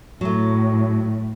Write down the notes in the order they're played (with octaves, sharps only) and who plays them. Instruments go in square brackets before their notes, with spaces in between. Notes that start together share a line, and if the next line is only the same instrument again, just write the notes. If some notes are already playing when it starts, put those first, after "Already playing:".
[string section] A2 [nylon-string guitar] F#3 A3